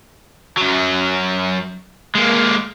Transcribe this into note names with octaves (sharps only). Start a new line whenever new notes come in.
F#2 F#3
G#3 A#3